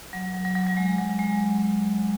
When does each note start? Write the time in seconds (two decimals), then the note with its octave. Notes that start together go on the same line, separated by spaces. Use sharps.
0.13 F#3
0.34 F#3
0.45 F#3
0.55 F#3
0.66 F#3
0.77 G#3
0.98 F#3
1.19 G#3